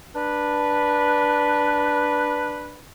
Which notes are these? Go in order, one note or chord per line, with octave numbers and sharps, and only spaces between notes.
D4 B4